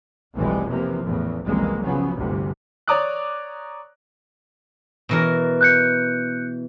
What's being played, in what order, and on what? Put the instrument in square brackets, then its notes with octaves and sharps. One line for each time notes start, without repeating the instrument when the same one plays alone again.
[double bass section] F1 B1 A2 E3 G3 G#3
C3 E3 F3 A#3
E2 A2 C#3
F#1 C2 F2 E3 G#3 A#3
C#3 F3 F#3 B3
G1 D2 G2 C3
[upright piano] C#5 D5 A#5 D6 D#6 F#6
[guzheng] B2 E3 A#4
[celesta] F#6 G6 C#7